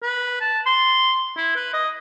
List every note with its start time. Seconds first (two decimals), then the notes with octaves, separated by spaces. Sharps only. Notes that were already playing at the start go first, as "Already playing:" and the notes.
0.03 B4
0.41 A5
0.66 C6
1.37 E4
1.56 B4
1.73 D#5